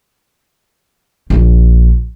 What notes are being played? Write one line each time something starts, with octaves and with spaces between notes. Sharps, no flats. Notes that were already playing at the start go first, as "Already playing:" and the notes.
A#1